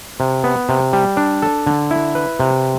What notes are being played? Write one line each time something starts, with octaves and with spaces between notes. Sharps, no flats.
C3
B3
C3
G3
D4
A4
D3
E4
B4
C3